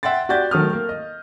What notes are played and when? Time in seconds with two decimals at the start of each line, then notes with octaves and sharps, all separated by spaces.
0.03 E5 F#5 G5 C6 A6
0.29 F#4 G4 D5 G6 A6
0.51 D#3 F#3 A3 D#6 F6
0.73 A#3
0.89 D#5